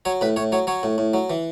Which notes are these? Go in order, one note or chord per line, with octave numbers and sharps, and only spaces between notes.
F#3 C#5
A2 B4
A2 C#5
F#3 C#5
F#3 C#5
A2
A2
F#3
E3